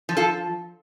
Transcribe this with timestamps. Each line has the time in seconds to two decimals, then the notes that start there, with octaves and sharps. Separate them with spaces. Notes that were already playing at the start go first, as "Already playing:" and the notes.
0.09 F3
0.17 F4 A4